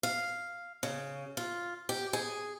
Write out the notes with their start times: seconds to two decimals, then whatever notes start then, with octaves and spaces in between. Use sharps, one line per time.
0.03 F5
0.83 C#3
1.37 F4
1.89 G4
2.13 G#4